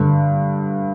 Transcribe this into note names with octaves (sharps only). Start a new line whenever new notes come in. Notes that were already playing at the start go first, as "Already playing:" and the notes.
Already playing: G2 D3